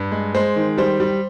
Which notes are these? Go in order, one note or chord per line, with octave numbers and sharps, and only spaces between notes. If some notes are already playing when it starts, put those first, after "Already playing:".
Already playing: G2
G#3
G#3 C5
D#3
G3 C5
G3